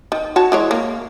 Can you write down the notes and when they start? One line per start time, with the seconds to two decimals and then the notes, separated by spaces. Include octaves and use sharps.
0.12 D#3
0.36 F#4 C#5 A5
0.52 E3 G#3 C#5
0.71 A#3